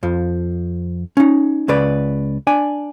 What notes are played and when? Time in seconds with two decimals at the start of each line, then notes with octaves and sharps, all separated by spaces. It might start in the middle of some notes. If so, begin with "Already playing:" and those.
0.03 F2 F3
1.17 C#4 D#4
1.68 C#2 C#3 B4 D5
2.47 D4 D5 G#5